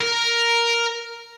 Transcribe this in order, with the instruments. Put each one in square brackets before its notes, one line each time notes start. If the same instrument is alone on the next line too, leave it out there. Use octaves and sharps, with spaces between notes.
[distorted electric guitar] A#4